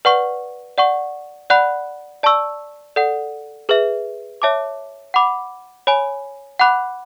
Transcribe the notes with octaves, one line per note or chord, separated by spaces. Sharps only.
B4 D5 F#5 C#6
D5 F#5 C#6
D5 F#5 B5 F#6
D5 A5 C#6 E6
A4 D5 F#5
G#4 B4 E5
C#5 E5 A5 D6
F#5 B5 D6
C#5 G#5 B5
F#5 B5 D6 F#6